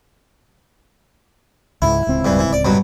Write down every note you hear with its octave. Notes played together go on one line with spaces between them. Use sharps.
C#2 G#2 E4
D1 C#2 C4
G2 E3
E3
D5
G2 B2 F#3